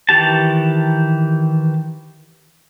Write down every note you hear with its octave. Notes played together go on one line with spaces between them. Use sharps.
D#3 E3 G4 A5